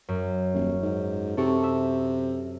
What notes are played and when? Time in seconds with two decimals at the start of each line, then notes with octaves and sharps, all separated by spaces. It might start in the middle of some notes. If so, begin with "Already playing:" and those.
0.08 F#2
0.54 D#1
0.82 G#2
1.37 C3 A4 C#6 D7
1.63 E5